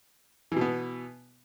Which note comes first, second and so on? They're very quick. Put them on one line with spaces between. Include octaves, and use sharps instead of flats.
E3 B2 B3